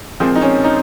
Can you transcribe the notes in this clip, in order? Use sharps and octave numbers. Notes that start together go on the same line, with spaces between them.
A#2 F3 G#3 C4
D#4
C#4
D#4